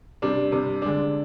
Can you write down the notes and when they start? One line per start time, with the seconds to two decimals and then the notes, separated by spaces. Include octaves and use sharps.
0.22 C3 G3 D4
0.52 C3 G3 D4
0.82 D3 G#3 D4